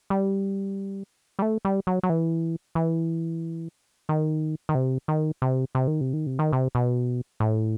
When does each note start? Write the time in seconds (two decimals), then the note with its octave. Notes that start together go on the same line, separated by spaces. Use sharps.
0.10 G3
1.39 G3
1.42 A3
1.65 G3
1.87 F#3
2.03 F#3
2.10 E3
2.75 E3
4.09 D#3
4.69 D#3
4.75 C3
5.08 D#3
5.42 C3
5.75 C3
5.87 D#3
6.01 C3
6.13 D#3
6.26 C3
6.39 D#3
6.53 C3
6.75 B2
7.40 A2